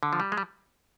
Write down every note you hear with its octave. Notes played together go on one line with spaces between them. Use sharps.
D3
F3
G3
G#3
G3